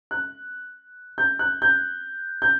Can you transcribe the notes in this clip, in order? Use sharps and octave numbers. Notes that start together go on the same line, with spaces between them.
F#6
G6
F#6
G6
G6